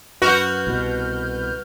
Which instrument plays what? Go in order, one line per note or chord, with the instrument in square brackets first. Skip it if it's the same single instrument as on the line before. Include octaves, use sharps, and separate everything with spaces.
[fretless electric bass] F#2 [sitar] F#4 [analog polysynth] B4 F6 G6
[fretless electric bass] C2 B2